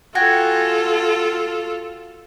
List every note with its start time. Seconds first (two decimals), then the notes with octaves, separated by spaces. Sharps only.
0.15 F4 F#4 A4 G5 G#5